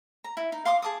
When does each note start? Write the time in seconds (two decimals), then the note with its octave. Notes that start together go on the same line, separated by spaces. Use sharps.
0.24 A#5
0.37 E4
0.52 D#4
0.65 F5 C6 D6 D#6
0.82 G#4 A5 D6 D#6